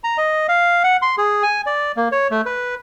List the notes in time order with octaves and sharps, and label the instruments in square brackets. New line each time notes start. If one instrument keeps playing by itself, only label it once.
[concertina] A#5
D#5
F5
F#5
C6
G#4
G#5
D5
A#3
C#5
A3
B4